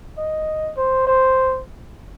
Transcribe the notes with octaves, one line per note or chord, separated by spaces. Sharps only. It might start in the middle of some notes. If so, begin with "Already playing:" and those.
D#5
C5
C5